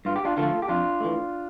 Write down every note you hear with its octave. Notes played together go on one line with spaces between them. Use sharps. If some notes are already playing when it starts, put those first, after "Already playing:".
G2 F4
G4
D4 F4
D3 F3 A3 F4 A4
G4
F2 D4 F4
E3 A3